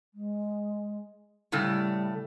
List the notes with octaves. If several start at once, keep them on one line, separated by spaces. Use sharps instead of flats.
G#3
A2 C#3 G3 A3